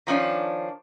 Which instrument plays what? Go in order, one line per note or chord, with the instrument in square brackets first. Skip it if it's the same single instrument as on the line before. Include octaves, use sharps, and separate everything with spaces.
[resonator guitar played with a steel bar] D#3 F3 C#4 D4